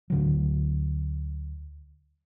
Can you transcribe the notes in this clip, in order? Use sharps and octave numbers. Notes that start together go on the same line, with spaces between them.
D2 D3 F#3